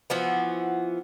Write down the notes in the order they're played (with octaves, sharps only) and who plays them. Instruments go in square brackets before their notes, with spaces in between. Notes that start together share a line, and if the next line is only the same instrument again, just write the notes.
[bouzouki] E3 F3 B3 F#4